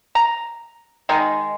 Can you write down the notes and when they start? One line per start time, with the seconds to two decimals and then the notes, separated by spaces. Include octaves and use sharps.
0.15 A#5
1.09 D#3 G#3 D#4